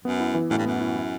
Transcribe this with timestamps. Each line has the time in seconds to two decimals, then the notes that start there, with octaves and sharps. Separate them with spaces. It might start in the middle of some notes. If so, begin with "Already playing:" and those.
0.04 F#2 B3
0.20 E4
0.34 E3
0.50 F#2 A2
0.58 G2
0.66 F#2 B3
0.80 E4
0.96 E4